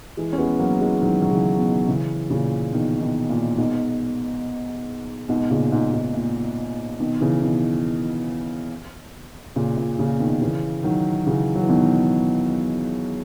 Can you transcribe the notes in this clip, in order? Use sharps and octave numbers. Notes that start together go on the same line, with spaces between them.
E3 G#3
C#4
G#3 B3
F#3 A#3
E3 G#3
D#3 F#3
F#3
C#3 E3
B2 D#3
C#3 E3
A#2 C#3
B2 D#3
B2 D#3
A#2
G#2 B2
G#2 B2
A#2 C#3
G#2
G#2
A#2
B2 D#3
C#3 E3
B2 D#3
A#2 C#3
A#2
A#2 C#3
B2 D#3
C#3 E3
D#3 F#3
C#3 E3
F#3
E3
B2 D#3